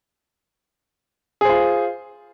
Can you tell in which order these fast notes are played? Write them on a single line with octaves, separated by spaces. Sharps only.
G#4 C5 F4